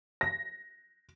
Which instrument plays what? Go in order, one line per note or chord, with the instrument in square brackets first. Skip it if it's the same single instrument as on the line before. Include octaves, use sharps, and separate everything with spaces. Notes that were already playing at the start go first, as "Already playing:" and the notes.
[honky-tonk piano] A#6